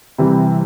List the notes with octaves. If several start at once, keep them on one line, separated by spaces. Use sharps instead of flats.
C3 E3 G3